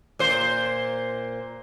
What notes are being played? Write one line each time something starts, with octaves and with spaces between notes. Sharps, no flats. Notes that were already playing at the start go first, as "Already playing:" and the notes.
A#2 C5